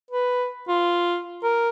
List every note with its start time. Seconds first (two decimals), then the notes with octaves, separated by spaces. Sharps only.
0.11 B4
0.68 F4
1.43 A#4